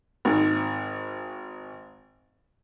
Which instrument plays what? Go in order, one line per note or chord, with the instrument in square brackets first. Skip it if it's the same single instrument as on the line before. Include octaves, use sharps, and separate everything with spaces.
[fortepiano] G#1 G#2